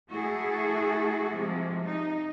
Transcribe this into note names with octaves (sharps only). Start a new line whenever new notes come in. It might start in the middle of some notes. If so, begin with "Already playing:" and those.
A3 E4 F#4 G#4 A4
C3 F3 G#3
D#4